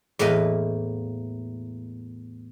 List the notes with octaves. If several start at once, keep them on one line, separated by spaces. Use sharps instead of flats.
E2 A2 A#3 B4 D#5